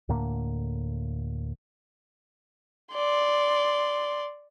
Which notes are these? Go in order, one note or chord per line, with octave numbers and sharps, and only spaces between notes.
D2 A2 D3 A#3
D5 C6